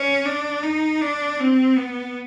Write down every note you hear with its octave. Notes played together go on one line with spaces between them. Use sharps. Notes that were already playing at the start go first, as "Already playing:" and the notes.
Already playing: C#4
D4
D#4
D4
C4
B3